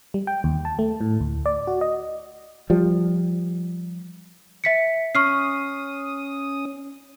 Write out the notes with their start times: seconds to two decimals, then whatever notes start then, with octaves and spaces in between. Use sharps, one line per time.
0.14 G3
0.27 G5
0.44 D#2
0.65 A5
0.79 A3
1.01 A2
1.20 D2
1.46 D5
1.67 F#4
1.81 D#5
2.70 F3 G3
4.64 E5 B6 C#7
5.15 C#4 C#6 D#6 F6 C7